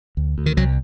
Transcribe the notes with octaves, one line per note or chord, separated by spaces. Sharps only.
D2
D2
D#3
C2 F#3